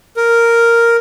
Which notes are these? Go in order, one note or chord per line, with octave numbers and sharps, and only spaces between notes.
A#4